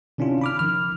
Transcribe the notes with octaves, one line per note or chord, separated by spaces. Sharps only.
C3 D#3 C#4 D4 E4 F4
B5 D6 F6
D#3 F3 F6